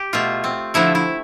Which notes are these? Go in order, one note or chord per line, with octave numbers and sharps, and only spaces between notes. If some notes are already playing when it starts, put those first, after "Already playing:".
Already playing: G4
B2 A3 F4
C4
D3 F3 A3 E4
E4